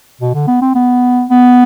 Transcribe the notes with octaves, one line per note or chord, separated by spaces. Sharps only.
B2
D3
B3
C4
B3
B3